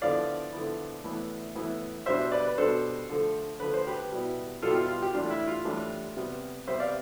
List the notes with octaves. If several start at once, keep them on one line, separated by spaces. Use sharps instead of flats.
D3 F3 B3 E4 D5 F5
D3 F3 B3 E4
A2 E3 B3 E4
A2 E3 B3 E4
B2 G3 D4 C5 E5
B4 D5
B4
B2 G3 D4 A4 C5
D3 F3 A3
D3 F3 A3 B4
C5
G4 B4
B2 G3 B3 E4
B2 G3 B3 E4 F4 A4
G4
F4
F4
G4
A2 E3 G3 D4 F4
E4
F4
A2 E3 G3 D4
C3 G3 B3
C3 G3 B3 C5 E5
D5 F5